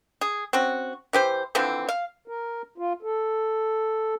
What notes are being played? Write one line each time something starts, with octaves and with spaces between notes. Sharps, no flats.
G#4
C4 C#4 F#4
E3 G4 C5
D3 E3 F3 C4
F5
A#4
F4
A4